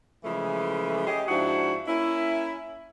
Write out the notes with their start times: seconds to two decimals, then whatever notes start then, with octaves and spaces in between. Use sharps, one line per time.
0.24 C#3 E3 F3 G#3 A3
1.07 C#4 G4 G#4 D#5
1.28 G#2 F3 D4 E4 F#4
1.87 A#3 C#4 E4